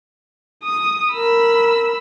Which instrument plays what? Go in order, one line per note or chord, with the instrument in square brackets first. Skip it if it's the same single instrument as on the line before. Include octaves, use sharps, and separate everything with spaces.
[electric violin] D#6
[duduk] A#4 [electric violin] B5 E6